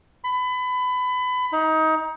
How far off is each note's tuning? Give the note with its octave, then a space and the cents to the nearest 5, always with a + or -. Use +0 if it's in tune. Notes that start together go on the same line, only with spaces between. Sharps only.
B5 +25
D#4 +25